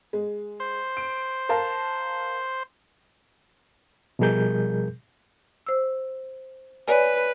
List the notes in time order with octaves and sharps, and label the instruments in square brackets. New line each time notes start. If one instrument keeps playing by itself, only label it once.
[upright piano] G#3
[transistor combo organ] C5
[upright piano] D7
A#4 F5 A5
[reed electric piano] B2 F3 G3 G#4 A#4 G6
[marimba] C5 E6
[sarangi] B4 [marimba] C#5 D5 G#5